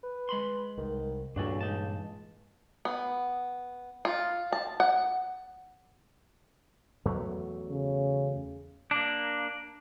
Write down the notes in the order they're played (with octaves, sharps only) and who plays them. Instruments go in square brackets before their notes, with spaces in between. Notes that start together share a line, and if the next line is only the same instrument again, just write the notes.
[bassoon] B4
[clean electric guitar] G#3 B5 C6
[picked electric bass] C2 [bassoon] D#3
[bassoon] C#2 [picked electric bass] G2 A#2 E3 [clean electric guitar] D4 F#4 A4
[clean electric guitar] G#3 D#4 A5
[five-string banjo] B3
F4
A5
F#5
[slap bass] E2 F#3 A3
[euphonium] C#3
[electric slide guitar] A#3 D4